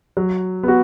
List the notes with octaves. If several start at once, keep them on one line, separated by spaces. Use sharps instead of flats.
F#3
B3 F#4